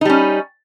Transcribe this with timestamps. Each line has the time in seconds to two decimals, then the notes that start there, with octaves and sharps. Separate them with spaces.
0.01 D#4
0.05 G3
0.09 C#4